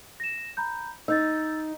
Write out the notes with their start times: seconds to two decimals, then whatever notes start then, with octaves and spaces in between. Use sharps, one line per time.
0.20 A#6 E7
0.57 A#5 B5 G6
1.08 D#4 E6 G6 A6